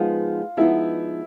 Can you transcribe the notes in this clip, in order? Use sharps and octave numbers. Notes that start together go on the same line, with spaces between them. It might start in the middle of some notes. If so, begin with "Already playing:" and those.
Already playing: F3 G#3 B3 D#4 F4
F3 G#3 B3 D#4 E4